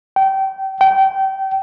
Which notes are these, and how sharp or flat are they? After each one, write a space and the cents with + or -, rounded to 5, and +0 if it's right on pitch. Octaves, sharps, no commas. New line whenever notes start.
G5 -25
G5 -25